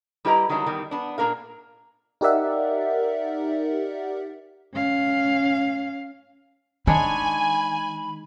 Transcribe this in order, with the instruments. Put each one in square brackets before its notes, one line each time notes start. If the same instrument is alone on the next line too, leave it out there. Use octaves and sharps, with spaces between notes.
[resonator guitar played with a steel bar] G3 E4 G4 B4 D#5 A#5
D3 D#3 F#3 G3 D4 E4
E2 D#3 E3 G3
B3 D4
A#2 A#3 D4 A#4 F5
[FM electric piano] D#4 G4 A#4 D5 E5 F#5
[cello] C#4 F5
[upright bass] D#3 [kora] G#3 D4 C#5 [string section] G#5 [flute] B5